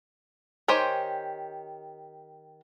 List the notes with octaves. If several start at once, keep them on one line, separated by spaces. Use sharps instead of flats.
D#3 G4 C5 C#5 G#5